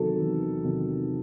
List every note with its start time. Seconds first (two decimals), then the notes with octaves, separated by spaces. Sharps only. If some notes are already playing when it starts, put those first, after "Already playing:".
Already playing: E2 C3 D#3 F#3 A4
0.20 E2
0.64 C3 D#3 F#3